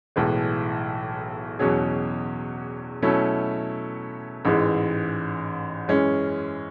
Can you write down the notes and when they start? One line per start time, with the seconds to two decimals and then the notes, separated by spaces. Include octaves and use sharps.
0.16 B1 A2 E3 G#3
1.59 E2 B2 F#3 C#4 G#4
3.02 B2 F#3 A3 C#4 E4
4.45 A1 G#2 E3 G#3
5.88 F#2 E3 G#3 C#4